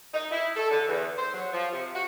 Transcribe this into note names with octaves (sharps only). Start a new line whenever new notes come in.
D#4
E4
A4
D3
E2
C5
F#3
F3
C3
F#4